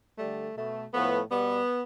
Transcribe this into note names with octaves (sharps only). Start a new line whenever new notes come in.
D3 G3 A3
B2 A3
A2 F3 A3 B3
B2 G3 B3